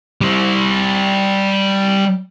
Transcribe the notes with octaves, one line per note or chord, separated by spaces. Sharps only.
G3 C5